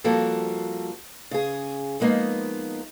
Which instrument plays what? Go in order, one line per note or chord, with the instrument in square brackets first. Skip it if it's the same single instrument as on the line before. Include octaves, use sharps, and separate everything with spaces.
[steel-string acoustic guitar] F3 G3 A#3 C4 F#4 A4
C#3 G#4
F3 G#3 A#3 B3 D#4